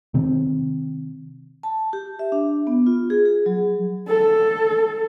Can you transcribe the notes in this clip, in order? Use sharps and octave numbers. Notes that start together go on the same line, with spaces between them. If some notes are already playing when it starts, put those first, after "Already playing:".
C3 D#3 C4
A5
G4
E5
D4
B3
F4
G#4
G#4
F#3
A4